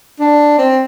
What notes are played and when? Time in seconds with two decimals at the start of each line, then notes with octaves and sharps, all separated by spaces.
0.20 D4
0.58 C4